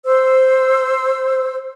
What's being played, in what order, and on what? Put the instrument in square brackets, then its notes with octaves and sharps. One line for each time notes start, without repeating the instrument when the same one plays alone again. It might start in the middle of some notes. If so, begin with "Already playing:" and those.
[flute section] C5 E6